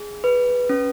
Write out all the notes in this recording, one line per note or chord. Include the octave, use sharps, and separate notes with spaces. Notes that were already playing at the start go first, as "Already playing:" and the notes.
Already playing: G#4
B4
C#4